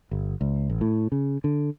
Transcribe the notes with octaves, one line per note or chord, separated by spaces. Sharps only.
G1
C#2
A1
A2
C#3
D3